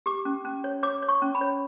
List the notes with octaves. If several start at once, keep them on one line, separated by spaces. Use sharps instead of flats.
G4 D6
C#4
C#4
C#5
C#5 D6
C#5
C#6
C#4
B5
C#5